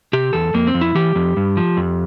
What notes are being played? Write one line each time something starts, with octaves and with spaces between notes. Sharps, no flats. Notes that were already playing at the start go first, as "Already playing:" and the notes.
C3 G4
E2 A4
F2 A#3
C4
F2
E4
E3 G4
F2
G2
F3
F2